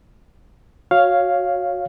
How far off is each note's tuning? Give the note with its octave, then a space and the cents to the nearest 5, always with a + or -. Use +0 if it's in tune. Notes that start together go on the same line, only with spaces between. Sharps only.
F#4 -15 C#5 +0 F5 +0